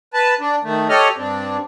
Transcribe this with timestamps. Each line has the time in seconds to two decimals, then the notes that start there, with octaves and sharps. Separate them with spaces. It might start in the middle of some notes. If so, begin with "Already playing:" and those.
0.14 B4 A5
0.40 D4
0.64 D#3 A3
0.89 G4 A4 C#5 D#5 F6
1.17 G2 C4 D4